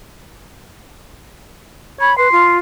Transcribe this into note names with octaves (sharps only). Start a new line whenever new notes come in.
C#5 B5
B4 C6
F4